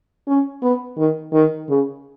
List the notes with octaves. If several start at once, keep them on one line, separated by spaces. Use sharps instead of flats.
C#4
B3
D#3
D#3
C#3